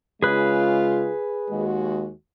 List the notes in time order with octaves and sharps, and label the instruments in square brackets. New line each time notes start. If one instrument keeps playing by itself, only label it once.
[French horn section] C#3 G#3 F4 [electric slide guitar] G#4 B4
[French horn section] D#2 G#3 F#4